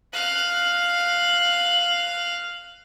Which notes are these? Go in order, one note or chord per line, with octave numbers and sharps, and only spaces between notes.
F5 F#6